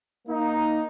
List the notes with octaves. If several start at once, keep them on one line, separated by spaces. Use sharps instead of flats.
A#3 D#4